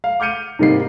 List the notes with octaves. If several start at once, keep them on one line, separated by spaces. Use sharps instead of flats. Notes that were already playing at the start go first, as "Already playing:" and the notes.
F5
D6 F6 G6 C#7 D#7
G#2 C3 G3 A#3 D#4 C7